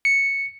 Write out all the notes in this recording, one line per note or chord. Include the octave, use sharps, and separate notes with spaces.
C#7